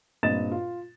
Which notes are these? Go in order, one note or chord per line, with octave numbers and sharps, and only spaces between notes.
G2 A#2 C4 D#5 A6 E7
F4